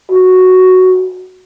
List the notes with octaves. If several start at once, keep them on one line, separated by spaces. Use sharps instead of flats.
F#4